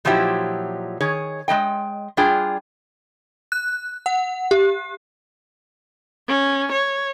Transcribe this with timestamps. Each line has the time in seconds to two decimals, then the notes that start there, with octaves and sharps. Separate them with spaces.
0.05 A#2 F3 F#3 D#4 E4 G4
1.00 D#3 G#4 C#5
1.48 G#3 B3 D#5 G5
2.17 G3 D4 F4 G#4 G5
3.52 F#6
4.06 F#5
4.51 G4
6.28 C#4
6.72 C#5